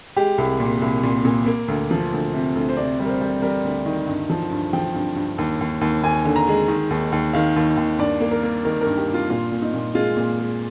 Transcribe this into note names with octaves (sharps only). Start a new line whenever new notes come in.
G#3 G4
C2
A#2
C2
A#2
A#2
A#3
D2
F3
D2
C3
D2
C5
C3 D5
G3
A#4
C5
G3
G3 A#4
D2
D#3
G2
F3
G2
F3 G5
G2
G2
D#2
D#2
D#2
D#2 G#5
D3
A#5
G#3
D#3
D#2
D#2
D#3 F5
D#2
D#2
G2 D5
A#3
A#4
A#3
D#3 A#4
A#4
G2
G4
G2
F4
A#2 F4
A#2
D#4
A#2
G#3 F4
A#2
G#3